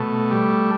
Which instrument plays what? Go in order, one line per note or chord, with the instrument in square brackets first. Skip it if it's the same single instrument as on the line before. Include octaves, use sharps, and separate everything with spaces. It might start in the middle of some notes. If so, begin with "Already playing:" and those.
Already playing: [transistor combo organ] B2 A3
G3